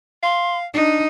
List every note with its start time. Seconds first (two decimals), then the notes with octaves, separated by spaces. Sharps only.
0.23 F5 C6
0.74 D4 D#4 D5